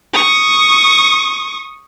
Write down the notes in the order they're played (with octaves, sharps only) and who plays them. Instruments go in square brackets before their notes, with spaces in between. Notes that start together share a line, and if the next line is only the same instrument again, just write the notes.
[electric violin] C#6 D#6